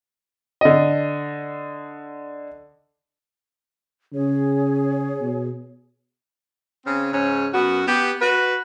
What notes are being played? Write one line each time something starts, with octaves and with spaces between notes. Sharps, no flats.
D3 D#5
C#3 G#4 C#5
B2
C#3 C4 C#4
G#2 C#3 C#4
F#2 B3 F#4
B3 G4
F#4 B4